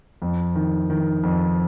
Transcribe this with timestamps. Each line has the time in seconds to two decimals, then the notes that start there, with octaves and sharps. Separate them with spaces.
0.22 F2
0.56 D#3
0.90 D#3
1.23 F2